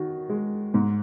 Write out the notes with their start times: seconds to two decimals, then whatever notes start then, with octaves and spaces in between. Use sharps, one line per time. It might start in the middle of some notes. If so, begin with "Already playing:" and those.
Already playing: D#3 F#4
0.29 G#3
0.74 G#2